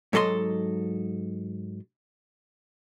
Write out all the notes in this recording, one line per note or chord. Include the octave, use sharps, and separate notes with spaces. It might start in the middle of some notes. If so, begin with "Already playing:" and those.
G#2 F#3 A4 D#5 C6